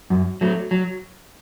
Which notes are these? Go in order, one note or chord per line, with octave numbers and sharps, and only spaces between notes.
F#2
F#3 A3
F#3